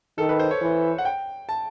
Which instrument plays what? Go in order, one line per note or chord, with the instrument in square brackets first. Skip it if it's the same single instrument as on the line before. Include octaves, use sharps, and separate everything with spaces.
[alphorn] D#3 [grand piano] A4
[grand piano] B4
C5
C#5
[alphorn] E3
[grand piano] F#5
G5
A5